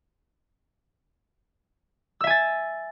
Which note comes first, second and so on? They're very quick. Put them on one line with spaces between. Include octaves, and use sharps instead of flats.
E6 E5 G#5 A6